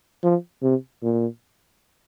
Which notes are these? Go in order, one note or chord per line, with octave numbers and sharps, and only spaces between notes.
F3
C3
A#2